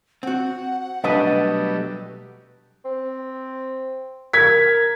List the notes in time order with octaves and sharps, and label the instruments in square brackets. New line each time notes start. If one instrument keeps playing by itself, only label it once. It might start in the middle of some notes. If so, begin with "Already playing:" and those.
[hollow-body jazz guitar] C4 F#4 [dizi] F#5
[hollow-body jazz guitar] B2 D4 G4 [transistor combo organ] F#3 G3 A3 [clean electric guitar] B4 D#5
[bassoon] C4
[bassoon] A#4 [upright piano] G#6 B6